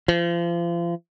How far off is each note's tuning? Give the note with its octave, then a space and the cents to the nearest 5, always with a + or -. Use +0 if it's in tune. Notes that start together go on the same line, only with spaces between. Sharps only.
F3 -35